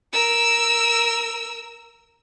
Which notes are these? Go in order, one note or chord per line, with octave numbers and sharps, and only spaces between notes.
A#4 E6